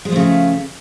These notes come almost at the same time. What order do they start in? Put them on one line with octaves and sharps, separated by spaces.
G#3 F3 A3 C#3